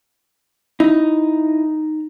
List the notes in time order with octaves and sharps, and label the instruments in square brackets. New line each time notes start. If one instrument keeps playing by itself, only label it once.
[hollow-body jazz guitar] D#4 [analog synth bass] E4